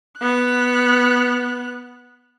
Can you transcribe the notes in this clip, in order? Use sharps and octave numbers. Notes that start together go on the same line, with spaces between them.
B3 F#6